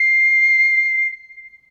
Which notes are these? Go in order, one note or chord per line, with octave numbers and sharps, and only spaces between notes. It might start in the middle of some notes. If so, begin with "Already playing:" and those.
Already playing: C7